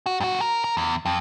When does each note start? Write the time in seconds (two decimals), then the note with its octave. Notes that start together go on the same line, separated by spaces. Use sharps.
0.06 F#4
0.20 G2 F#4
0.41 A#4
0.64 A#4
0.77 E2
1.05 F2